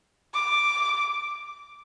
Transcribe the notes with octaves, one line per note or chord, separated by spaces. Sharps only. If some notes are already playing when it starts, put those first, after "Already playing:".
D6